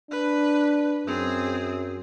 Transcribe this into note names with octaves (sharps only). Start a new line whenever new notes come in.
D4 B4
F#2 C4 G#4